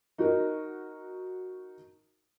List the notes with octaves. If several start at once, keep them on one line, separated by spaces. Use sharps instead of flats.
D#4 F#4 A#4